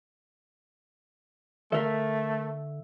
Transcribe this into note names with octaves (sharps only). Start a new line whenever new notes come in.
D3 A3 A4 A#4 E5 F5 B6